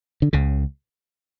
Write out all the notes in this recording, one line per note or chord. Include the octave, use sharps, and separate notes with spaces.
D3
C#2 C#3